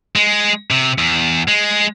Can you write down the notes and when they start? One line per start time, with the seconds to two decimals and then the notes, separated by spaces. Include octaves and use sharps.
0.16 G#3
0.71 C3
0.98 E2
1.48 G#3